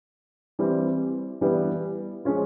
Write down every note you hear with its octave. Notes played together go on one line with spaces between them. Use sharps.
E3 G3 C4
E3 G3 B3
F3 G#3 C#4 F4